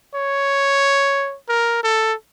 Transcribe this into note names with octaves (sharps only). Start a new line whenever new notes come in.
C#5
A#4
A4